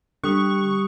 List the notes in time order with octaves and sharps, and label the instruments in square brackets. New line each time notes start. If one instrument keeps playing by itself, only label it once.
[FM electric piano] D3 [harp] G3 [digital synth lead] C#6 [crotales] D#6 F#6